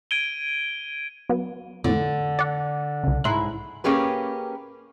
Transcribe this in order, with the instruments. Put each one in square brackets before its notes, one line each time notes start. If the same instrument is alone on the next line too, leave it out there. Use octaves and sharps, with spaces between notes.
[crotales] G#6 D7 D#7 G7
[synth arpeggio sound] F#3 B3
[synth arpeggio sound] F2 A2 [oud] D3
[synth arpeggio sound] D5 F#5
C2 C#3
[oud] G#2 E4 [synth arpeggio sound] C6 F#6
[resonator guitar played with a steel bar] A#3 C#4 G4 G#4 B4